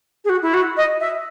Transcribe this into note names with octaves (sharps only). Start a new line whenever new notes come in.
G#4
F#4
E4
F#4
D#5
E5